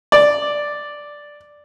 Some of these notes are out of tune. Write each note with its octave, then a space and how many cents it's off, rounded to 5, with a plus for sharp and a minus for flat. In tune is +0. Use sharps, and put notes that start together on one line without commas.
D5 +0